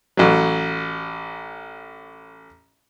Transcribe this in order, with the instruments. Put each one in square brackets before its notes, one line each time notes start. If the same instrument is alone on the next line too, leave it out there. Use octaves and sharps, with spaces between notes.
[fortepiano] A1 F#3